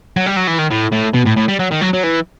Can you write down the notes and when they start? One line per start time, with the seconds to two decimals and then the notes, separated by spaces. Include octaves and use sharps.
0.17 F#3
0.26 G3
0.37 F#3
0.48 E3
0.59 D#3
0.71 A2
0.92 A2
1.14 B2
1.26 A2
1.37 A2
1.48 G3
1.59 F#3
1.71 D#3
1.81 F#3
1.93 F#3
2.03 E3